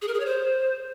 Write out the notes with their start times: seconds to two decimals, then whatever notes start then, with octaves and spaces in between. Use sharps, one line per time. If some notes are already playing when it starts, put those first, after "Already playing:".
0.02 G#4
0.08 A#4
0.14 G#4
0.20 C#5
0.26 C5